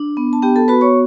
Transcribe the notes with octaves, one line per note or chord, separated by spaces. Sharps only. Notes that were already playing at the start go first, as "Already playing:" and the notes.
Already playing: D4
B3
A5
B3 G4 G5
A4 A5
F#4 B4 B5
C#5 C#6